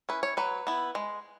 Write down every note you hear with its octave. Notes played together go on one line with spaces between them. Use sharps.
C#4 E4 B4
C#5
F#3 B4
B3 E4
G#3